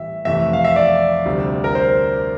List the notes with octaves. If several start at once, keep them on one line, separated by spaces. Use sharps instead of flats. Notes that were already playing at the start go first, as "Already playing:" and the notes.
Already playing: A2 E3 G3 E5
F2 C3 E3 A3 E5
F5
E5
D5
D2 C3 G3
A#4
C5